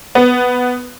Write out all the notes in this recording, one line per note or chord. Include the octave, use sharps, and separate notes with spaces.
B3